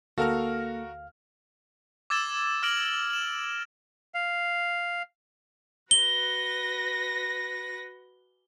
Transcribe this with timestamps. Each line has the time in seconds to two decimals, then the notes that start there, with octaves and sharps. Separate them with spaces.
0.18 D2 A#3 F#4 A4 A#4 F5 F6
2.10 D6 E6 G#6 A6 E7 G7
2.63 D6 F6 A#6 D7 F#7 G7
3.10 E7 F#7
4.14 F5
5.91 F#4 B4 A#6 G7